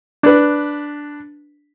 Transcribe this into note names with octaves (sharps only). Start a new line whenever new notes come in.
D4 B4